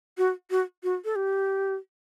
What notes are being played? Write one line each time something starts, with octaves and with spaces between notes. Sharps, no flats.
F#4
F#4
F#4
A4
G4